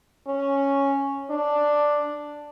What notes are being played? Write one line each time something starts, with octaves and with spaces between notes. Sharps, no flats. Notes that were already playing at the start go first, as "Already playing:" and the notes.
C#4
D4